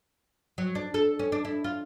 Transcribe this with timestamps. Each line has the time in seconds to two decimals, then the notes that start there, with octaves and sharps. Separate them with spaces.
0.58 F#3
0.75 D4
0.94 A4
1.19 C#4
1.32 D4
1.45 E4
1.64 F4